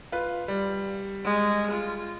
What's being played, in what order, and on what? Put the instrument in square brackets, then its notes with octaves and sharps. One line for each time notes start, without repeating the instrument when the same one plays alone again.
[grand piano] F4 B4
G3
[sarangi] G#3
F4